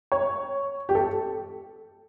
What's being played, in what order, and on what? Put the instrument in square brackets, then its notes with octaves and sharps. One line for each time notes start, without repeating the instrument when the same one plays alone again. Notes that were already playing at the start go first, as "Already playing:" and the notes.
[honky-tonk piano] C#5
G4
A4